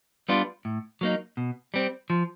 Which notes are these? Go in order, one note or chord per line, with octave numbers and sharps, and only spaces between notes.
G3 B3 D4 F4
A2
F#3 A#3 D#4
B2
G3 C4
F3